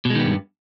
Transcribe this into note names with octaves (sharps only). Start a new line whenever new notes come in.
G2 B2 D#3 G#3 B3